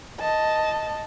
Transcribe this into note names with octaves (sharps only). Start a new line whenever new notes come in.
D#5 A5